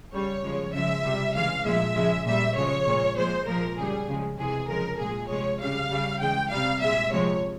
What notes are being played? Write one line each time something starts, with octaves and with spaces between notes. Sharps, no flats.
C#3 G3 C#5
C#3 F3 G#3
C#3 F3 G#3 E5
C3 G3
C#3 E3 G#3 F5
A#2 F3 G#3 E5
C#3 F3 G#3
A#2 G3 E5
C#3 F3 G#3 C#5
A#2 G#3
A#2 F3 G#3 C5
A#2 F3 G#3 A#4
C#3 G3 G#4
C#3 F3 G#3
C3 E3 G#3 G#4
C#3 F3 G#3 A#4
A#2 F3 G#3 G#4
C3 F3 G#3 C#5
C#3 G3 F5
C#3 G3
C#3 E3 G#3 G5
C3 G3 F5
A#2 G#3 E5
C3 F3 G#3 C#5